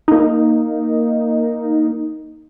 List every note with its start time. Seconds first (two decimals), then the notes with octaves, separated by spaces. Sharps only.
0.08 A#3 D#4